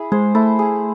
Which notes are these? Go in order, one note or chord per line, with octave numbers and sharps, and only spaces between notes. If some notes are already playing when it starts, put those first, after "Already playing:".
Already playing: E4 G#4
G#3 C5
A3 E4
G#4